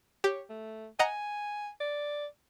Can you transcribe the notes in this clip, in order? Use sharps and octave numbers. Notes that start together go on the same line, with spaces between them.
G4 C#5
A3
D#5 F#5 G#5 A#5
D5